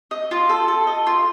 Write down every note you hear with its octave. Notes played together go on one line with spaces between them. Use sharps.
D#5
F4
A4
A4
D#5
F4